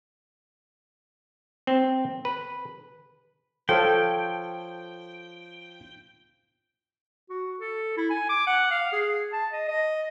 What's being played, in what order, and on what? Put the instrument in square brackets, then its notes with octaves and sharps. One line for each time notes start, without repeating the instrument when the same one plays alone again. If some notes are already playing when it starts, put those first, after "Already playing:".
[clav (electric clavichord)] C4
B4
[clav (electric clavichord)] F3 C#5 F5 [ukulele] A4 [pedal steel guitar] G5
[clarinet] F#4
A4
E4
G#5
D6
F#5
F5
G#4
A5
D#5
D#5